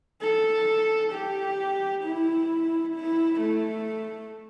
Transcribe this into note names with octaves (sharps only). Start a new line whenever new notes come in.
A4
G4
E4
E4
A3